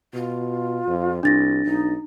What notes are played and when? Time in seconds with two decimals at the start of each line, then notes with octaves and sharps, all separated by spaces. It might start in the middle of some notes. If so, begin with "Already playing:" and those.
0.14 B2 F4
0.88 F2
1.23 C2 D4 A6 A#6
1.66 B1 D#4